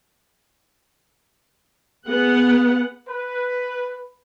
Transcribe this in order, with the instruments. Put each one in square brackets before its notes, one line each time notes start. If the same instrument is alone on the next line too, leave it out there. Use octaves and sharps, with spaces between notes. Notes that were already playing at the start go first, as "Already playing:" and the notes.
[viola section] B3 G#4 F#5
[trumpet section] B4